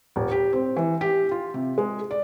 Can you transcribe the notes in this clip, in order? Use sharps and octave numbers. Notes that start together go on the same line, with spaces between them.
D#1
G4
C4
E3
G4
F4
C3
G#3
D5